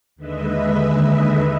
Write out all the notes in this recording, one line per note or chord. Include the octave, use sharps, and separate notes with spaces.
D#2 D3 G#3 B4 D#5 E5